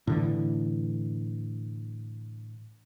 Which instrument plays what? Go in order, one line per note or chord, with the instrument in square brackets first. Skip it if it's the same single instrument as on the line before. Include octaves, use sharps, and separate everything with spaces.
[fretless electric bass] A2 D3 E3